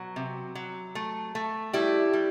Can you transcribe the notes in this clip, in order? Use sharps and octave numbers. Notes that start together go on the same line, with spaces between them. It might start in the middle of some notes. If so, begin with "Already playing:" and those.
Already playing: B2 F#3
C3
F#3
A3
A3
G3 E4 G4
G3